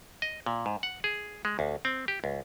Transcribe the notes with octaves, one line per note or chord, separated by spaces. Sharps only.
D#5
A#2
G#2
F#5
G#4
G#3
D2
C4
G4
C#2